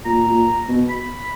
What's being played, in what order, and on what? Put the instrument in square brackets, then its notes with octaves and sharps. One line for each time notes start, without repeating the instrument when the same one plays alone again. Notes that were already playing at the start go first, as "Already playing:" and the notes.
[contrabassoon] A#2 [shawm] A#5
[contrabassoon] A#2
B2
[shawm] B5